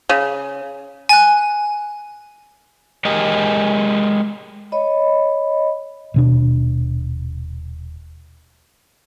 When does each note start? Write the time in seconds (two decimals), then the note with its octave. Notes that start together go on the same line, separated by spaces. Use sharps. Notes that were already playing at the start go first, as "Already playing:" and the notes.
0.09 C#3
1.09 G#5 F#6
3.05 G#3 G4 A#4 D#5
4.72 C#5 D#5 B5
6.14 D#1 B2 D4